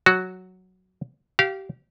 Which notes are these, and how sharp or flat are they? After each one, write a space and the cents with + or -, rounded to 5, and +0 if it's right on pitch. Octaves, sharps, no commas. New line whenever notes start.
F#3 +0 F#4 +0
G4 -25 F5 -10